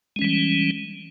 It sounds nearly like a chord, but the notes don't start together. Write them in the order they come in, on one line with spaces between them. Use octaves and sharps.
G#3 C#4 E3 G3